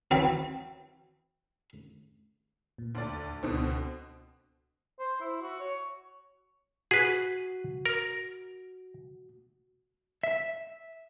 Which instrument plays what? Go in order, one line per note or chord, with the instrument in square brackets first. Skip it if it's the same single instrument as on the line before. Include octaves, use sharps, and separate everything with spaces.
[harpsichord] E3 F#3 C4
[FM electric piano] A#2
[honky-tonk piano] D2 D5
[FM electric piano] D#2
[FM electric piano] C#2 [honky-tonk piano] B2 D3 C4
[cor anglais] C5
E4
F#4
C#5
[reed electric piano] F#4 [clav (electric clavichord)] G#4 B4
[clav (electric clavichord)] A#4
[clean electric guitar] E5